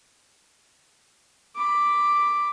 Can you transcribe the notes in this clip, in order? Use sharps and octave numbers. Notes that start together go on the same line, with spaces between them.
B5 D6